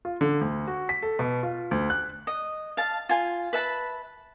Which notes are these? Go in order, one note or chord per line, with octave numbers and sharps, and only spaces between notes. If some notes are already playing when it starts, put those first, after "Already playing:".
F4
D3
D2
F#4
B6
A4
B2
F4
D2
F#6
D#5
F5 A5
F4 G#5
B4 E5 A5 B5